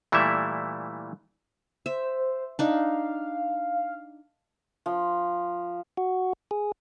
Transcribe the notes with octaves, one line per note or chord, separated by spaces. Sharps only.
A#2 E3 G3 A3 E4 E5
C5 E5
D4 D#4 F5
F3
F#4
G#4